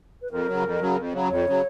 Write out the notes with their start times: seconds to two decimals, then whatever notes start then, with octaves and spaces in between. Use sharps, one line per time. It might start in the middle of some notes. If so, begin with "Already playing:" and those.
0.22 B4
0.31 F2 A#4
0.47 C#3 F#3
0.63 F2
0.80 C#3 F#3
0.97 F2
1.12 C#3 F#3
1.29 F2 C#5
1.45 C#3 F#3